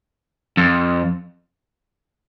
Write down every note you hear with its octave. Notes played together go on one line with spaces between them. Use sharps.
F2